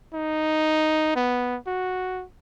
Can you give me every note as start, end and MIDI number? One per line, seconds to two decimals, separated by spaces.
0.14 1.14 63
1.16 1.57 59
1.67 2.24 66